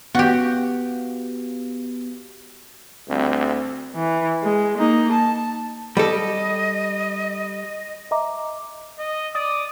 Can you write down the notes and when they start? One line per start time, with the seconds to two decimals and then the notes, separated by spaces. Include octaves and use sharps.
0.15 B3 F#4 G4
3.09 D2 G3 C4
3.96 E3
4.43 G#3
4.78 A#3 D#4
5.13 A5
5.97 G3 A4 D#5
8.11 D#5 E5 A#5 D6
8.99 D#5
9.35 D5 D#6